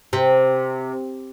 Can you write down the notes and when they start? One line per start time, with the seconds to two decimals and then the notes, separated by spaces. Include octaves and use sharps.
0.13 C3